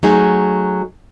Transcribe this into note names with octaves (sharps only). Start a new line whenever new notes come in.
F#3 A3 D#4 G#4